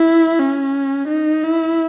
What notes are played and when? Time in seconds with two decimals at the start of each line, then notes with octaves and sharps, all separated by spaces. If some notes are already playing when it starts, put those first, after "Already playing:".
Already playing: E4
0.39 C#4
1.08 D#4
1.44 E4